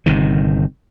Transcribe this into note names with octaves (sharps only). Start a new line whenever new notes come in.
G1 C3 D#3